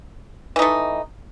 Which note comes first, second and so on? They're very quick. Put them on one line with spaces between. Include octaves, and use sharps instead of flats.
E3 D#4 A3